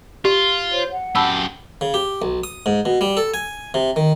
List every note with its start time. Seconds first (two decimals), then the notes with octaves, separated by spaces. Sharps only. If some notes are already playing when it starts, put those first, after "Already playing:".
0.25 F4 G4
0.71 C5 C#5
0.92 F#5
1.16 F#2 G4 A5 B5 E6
1.81 C#3
1.94 G4
2.22 B1
2.44 D#6
2.66 G#2
2.85 B2
3.01 G3
3.17 A4
3.34 G#5
3.74 C3
3.96 D#3